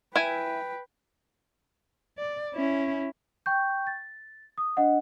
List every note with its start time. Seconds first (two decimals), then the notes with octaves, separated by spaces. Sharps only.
0.16 E4 B4 G5 G#5
2.18 D5
2.55 C#4 E4
3.46 G5 C#6 G6
3.87 A6
4.58 D#6
4.77 D4 D#5 F#5